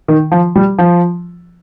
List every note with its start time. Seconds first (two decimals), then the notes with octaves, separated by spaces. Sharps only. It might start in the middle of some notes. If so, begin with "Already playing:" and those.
0.08 D#3
0.32 F3
0.56 G3
0.79 F3